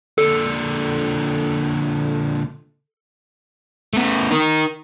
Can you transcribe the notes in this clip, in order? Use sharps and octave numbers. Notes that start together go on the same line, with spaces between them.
A#2 D3 A4
A3 B3
D#4 A#4